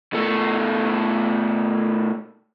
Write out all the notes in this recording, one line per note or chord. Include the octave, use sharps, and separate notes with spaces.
B2 A3